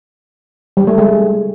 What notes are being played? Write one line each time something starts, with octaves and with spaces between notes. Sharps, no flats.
G3
A3
G#3